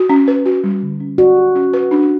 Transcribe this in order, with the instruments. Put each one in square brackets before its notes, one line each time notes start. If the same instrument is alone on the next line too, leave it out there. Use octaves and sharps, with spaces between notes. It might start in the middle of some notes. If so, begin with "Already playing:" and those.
Already playing: [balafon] F#4
C#4
B4
F#4
G3
D3
C#4
[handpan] F#4 [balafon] D5
[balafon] G4
C#4
B4
D4